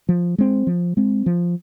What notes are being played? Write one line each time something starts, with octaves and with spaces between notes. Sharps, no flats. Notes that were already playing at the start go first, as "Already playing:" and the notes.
F3
G#3 C4
F3
G#3 C4
F3